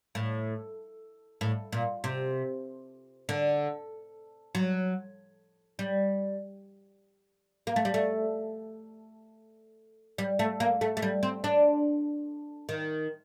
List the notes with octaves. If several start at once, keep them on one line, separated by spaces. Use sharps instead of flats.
A2
A2
A#2
C3
D3
F#3
G3
A#3
A3
G3
A3
G3
A3
A#3
A3
A3
G3
C4
D4
D#3